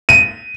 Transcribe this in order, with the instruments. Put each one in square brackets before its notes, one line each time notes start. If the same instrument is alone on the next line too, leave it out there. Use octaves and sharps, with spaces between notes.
[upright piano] D#7